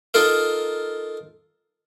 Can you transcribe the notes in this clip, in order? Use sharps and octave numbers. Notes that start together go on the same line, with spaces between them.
D#4 F4 A4 A#4 F5